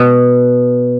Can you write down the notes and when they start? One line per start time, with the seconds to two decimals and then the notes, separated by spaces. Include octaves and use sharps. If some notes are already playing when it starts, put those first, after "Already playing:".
Already playing: B2